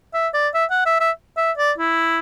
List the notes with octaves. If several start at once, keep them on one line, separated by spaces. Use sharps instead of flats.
E5
D5
E5
F#5
E5
E5
E5
D5
E4